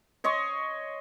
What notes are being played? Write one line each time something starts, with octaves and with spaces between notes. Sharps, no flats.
C#5 D#5 C6 C#6